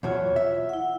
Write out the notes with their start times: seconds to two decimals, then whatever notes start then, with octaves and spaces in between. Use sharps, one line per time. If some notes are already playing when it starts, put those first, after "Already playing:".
0.03 E2 B2 F#3 F4 C#5
0.36 E5
0.69 E4 F#5